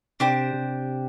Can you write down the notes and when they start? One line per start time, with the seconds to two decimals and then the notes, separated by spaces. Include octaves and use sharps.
0.20 C3 D4 G4 C5
0.54 C3